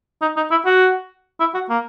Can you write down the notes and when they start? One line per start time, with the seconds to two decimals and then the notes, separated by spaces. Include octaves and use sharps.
0.22 D#4
0.37 D#4
0.51 E4
0.66 F#4
1.40 E4
1.54 F#4
1.69 A#3